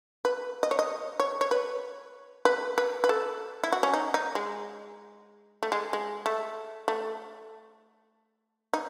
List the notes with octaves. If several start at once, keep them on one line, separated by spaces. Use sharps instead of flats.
B4
D#5
C#5
D#5
C#5
C#5
B4
B4
B4
B4
A4
E4
F#4
C#4
D#4
D#4
G#3
A3
G#3
G#3
A3
A3
D#4